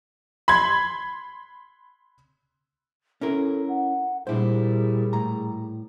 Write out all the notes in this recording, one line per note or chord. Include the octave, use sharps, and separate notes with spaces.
B5 C6 G#6
C#4 E4 A4 A#4
F#5
A#2 G3 D4 E4 G#4 C5
A2 A#5